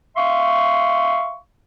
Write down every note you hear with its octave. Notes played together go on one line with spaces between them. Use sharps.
E5 F5 C6 C#6